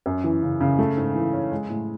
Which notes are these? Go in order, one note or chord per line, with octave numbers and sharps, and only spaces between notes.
F#2
E3
C#3
C#3
A3
G#2
E3
C#4
G#3
A2